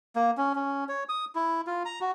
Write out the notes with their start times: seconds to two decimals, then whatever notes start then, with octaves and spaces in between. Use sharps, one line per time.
0.16 A#3
0.37 C#4
0.55 C#4
0.89 C#5
1.09 D#6
1.35 E4
1.67 F4
1.85 A#5
2.01 F#4